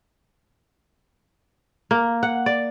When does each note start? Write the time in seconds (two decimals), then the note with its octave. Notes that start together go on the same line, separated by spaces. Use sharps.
1.91 A#3
2.23 F#5
2.46 D5